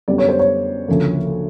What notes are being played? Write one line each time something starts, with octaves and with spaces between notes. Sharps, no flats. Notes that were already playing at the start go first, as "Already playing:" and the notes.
F#2 D3 G3 B3 D5
C#5
C5
C#5
D2 C#3 F3 A#3